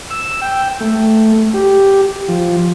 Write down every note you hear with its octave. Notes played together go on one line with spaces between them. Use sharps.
E6
G5
A3
G4
F3